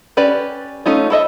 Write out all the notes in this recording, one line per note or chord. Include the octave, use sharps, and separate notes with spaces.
C#4 G4 B4 D5
A3 C#4 D#4 F4
E4 A4 D#5 E5